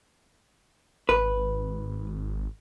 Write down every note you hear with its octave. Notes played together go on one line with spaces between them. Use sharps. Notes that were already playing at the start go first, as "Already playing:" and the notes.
G#1 B4